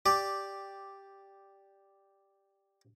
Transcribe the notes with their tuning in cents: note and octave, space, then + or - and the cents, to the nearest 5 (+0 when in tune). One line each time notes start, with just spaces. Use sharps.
G4 +0 D5 +0